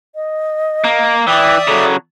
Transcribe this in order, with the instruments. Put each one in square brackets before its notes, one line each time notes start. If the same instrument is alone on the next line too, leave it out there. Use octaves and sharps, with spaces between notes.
[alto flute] D#5
[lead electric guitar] A#3
[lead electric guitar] E3 [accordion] D5 E5 D#6 [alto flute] G5
[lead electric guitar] C#3 F#3 [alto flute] A4